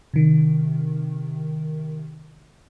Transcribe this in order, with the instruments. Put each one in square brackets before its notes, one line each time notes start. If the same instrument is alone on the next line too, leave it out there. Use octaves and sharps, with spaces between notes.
[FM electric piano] C3 D#3